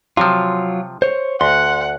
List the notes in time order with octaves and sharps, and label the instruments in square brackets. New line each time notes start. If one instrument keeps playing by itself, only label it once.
[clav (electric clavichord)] C3 F3 [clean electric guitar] F#3 F4
[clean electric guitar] C5 C#5
[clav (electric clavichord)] D2 [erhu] F#5 [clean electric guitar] C6